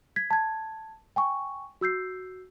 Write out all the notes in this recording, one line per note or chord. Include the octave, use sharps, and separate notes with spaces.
G#6 B6
A5 G#6
G5 G#5 C#6
F#4 E6 G6 C7